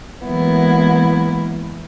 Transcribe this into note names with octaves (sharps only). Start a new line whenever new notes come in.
E3 F#3 G#3 A#3 B3 E4